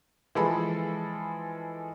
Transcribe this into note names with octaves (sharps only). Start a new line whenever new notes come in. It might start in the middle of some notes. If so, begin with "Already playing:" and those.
E3 F3 G#3 A4 B5